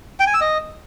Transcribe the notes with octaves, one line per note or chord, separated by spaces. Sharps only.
G5
G#5
E6
D#5